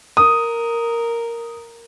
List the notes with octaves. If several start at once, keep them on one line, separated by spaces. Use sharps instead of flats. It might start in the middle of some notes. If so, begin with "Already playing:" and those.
A#4 D#6